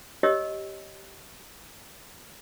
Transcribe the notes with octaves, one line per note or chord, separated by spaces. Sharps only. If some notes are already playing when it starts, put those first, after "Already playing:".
G4 C#5 D#5 E6